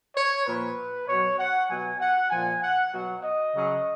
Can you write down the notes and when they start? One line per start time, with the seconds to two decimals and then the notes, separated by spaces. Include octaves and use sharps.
0.14 C#5
0.46 A#2 F3 B4
1.07 B2 F#3 C#5
1.38 F#5
1.69 B2 F#3 G#5
1.99 F#5
2.30 A#2 F3 G#5
2.62 F#5
2.92 B2 F#3 F#5
3.23 D#5
3.54 C#3 F#3